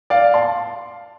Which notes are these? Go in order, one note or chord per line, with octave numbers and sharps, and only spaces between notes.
D5 F5
A5 C6